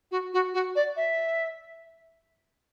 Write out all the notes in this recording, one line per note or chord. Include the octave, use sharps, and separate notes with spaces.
F#4
F#4
F#4
D5
E5